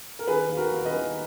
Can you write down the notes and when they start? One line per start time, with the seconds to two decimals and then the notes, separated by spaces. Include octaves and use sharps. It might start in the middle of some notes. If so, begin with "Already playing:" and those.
0.19 A#4
0.27 D#3 G#4 B4
0.49 D#2
0.56 F#4 A#4
0.72 D#2
0.85 B4 D#5
0.93 D#3